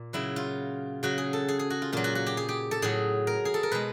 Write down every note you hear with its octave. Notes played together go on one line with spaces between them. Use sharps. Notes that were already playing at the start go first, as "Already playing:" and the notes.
Already playing: A#2
C#3 F#3 E4
F4
C#3 F#3 F#4
G#4
A4
G#4
G#4
F#4
F4
A#2 F#3 F4
F#4
F#4
G4
G#4
G4
A4
A2 F#3 G#4
A#4
G#4
A4
A#4
B2 G#3 B4